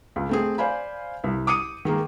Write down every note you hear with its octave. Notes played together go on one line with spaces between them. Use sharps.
C#2
A3 C4 G#4
C5 D5 F5 G#5 B5
C2
D6 D#6 C#7 D#7
D#3 G#3 A#3